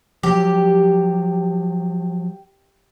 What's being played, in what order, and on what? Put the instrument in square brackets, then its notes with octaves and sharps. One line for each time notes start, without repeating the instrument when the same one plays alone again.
[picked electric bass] F3 F#3 [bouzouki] G4